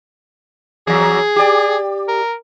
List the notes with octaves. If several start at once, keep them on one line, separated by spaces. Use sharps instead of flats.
E2 F#3 G#4
G4 D5
A#4